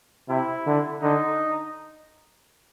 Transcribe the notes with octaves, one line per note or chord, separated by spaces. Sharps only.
C3 E4
D3
D3 D#4